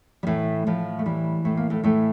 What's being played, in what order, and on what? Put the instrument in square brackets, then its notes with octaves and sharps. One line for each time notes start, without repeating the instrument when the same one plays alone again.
[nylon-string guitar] G3
A2 E3 A3
A2 F3
A3
E3 G3
A2 A3
A#3
A2 A3
A2 E3 A3